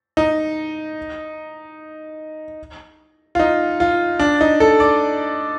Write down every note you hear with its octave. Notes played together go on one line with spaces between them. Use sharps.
D#4
F4
D#4
F4
D4
D#4
A4
D5